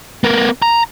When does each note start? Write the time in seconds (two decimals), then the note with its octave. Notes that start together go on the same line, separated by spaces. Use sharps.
0.24 B3 A#4
0.62 A#5